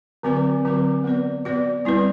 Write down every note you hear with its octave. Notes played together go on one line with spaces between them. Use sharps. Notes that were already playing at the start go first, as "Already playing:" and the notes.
D3 F#3 C4 F#4 B4
D3 F#3 C4 F#4 B4
B3 F#4 B4 D5
B3 F#4 B4 D5
G3 C4 E4 B4 D5